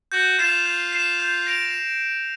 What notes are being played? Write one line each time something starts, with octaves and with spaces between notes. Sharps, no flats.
F#4 G6
F4 C7 E7
G6
C7 E7
G6
A#6 D7 F7